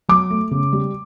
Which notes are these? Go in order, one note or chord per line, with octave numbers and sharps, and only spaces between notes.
F#3 D6
A3
C#3
G3